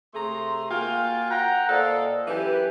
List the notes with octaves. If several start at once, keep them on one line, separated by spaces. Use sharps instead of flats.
C3 A3 G#4 A#5 C6
A#3 F4 F#4 F5 G5 G#5
F#5 G5 A#5
A#2 A4 C5 D5 D#5 F5
F#2 E3 C#4 G4 B4 G#5